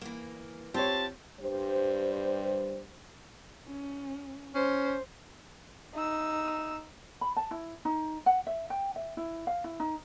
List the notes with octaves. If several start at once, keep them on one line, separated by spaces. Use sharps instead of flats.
E3 A#3
C4 F4 G4 C#5 A5
G2 G3 C5
C#4
C#4 C5
D#4 E6
B5
A5
E4
D#4
F#5
E5
G5
E5
E4
F5
E4
D#4